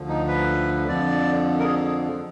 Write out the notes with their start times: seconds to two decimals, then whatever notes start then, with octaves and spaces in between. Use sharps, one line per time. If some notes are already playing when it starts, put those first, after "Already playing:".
Already playing: D2 D3 F3
0.09 D#4
0.28 B4
0.88 F2 D3 F3 D5
1.59 A#4
1.64 G#4